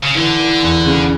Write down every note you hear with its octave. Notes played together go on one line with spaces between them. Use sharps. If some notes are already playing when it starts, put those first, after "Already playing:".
C#3
D3 E3
E3
E2
C#3